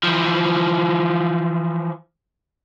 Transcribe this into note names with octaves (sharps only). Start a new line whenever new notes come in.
E3 F3